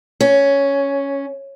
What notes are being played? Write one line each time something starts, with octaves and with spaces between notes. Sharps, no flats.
C#4